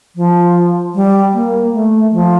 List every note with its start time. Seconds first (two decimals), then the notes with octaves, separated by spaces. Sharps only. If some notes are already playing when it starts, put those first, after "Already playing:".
0.16 F3
0.95 G3
1.34 A#3
1.73 A3
2.12 F3